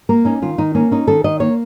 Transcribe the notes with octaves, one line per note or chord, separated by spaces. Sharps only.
A#3 A#4
C#4 D#4
D#3 F4
D#3 D#4
A#3 C#4
C#4 D#4
D#3 A4
D#3 D#5
A#3 C#5